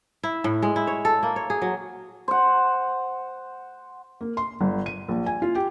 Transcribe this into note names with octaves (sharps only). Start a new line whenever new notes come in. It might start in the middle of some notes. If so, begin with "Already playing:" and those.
E4
A2
G#3
E4
C#5
A4
A#3
C#5
G#4
F#3
C5 F#5
A#3
C6
G1
D#7
A#1
G#5
F4
G4